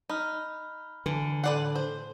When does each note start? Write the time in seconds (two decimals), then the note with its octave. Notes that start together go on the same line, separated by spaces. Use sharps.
0.09 D#4 B5 F6
1.06 D3 E3
1.44 A2 B4 D5 F#5 G5 C6
1.76 C5